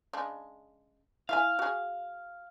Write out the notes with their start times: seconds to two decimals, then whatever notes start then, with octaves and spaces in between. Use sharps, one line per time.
0.13 C#3 G#3 D4
1.29 E4 E5 F5 G#5
1.59 F#4 G#4